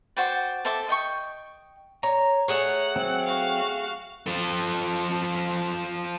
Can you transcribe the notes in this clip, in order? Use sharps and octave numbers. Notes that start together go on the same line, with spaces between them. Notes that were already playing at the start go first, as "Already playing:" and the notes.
F#4 C5 D5 G5
A4 C5 E5 D6
D#5 G5 C#6
C#5 A#5
A3 G#4 C#5 F#5
F#3 C4
F#4 F5
F3 A4